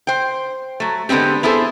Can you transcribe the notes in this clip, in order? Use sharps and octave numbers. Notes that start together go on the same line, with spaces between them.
C5 G5
F#3 A3
D3 G#3 B3 C4 G4
B3 E4 G#4 A4 C5